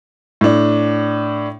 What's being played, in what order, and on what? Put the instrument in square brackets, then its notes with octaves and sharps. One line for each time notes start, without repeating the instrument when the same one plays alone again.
[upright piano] A2 D4